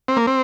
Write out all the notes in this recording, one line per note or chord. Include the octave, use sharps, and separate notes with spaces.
C4
A#3
C4